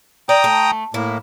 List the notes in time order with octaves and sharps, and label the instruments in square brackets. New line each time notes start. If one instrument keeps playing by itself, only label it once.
[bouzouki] D5 [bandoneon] G5 A#5 D#6
[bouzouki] A3
[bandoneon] A2 A#3 [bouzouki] E4